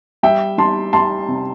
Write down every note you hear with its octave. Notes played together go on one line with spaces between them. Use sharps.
G3 E5 G5
G3 A5 C6
G3 A5 C6
C3